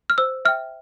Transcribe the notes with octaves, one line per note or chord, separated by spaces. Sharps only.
F6
C5 E6
E5 G5 F6